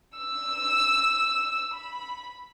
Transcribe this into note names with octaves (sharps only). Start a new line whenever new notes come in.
E6
B5